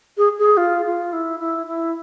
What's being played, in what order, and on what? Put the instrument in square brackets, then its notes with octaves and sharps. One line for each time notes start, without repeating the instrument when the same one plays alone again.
[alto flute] G#4
G#4
F4
F4
E4
E4
E4